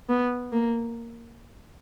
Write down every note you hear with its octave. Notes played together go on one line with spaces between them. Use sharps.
B3
A#3